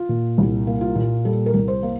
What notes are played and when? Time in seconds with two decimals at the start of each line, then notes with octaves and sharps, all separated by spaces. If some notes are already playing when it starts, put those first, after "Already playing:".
Already playing: F4
0.09 A#2
0.38 C2
0.67 A#3
0.81 F4
0.95 A#2
1.25 G3 A4
1.46 A#4
1.54 C2
1.68 C5
1.83 A#3